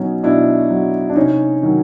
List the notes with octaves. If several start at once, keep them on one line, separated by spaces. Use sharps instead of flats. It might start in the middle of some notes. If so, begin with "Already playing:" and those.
Already playing: B2 F#3 C#4 D#4
B2 D4 E4
F#3
D4
C3 C#4 D#4
D#3 F#3